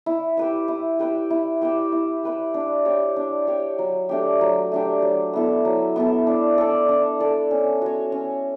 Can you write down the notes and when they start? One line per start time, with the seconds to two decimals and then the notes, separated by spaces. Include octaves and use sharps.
0.06 E4
0.37 G4 B4 E5
0.68 E4
0.99 G4 B4 E5
1.30 E4
1.62 G4 B4 E5
1.92 E4
2.23 G4 B4 E5
2.54 D4
2.85 G4 C#5
3.16 D4
3.47 G4 C#5
3.79 F#3
4.09 A3 D4 G4
4.41 F#3
4.72 A3 D4 G4
5.02 F#3
5.33 B3 E4 A4
5.65 F#3
5.96 B3 E4 A4
6.27 D4
6.58 A4 D5
6.89 D4
7.20 A4 D5
7.51 C#4
7.82 F#4 C#5
8.12 C#4